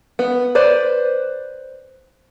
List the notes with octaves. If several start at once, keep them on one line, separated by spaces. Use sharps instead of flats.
B3
B4 C5 D5